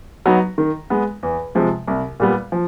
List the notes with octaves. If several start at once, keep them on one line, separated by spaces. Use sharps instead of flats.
F#3 B3 D#4
D#3
G#3 B3
E2
C3 F3 G#3
C2
A#2 G3 B3
F3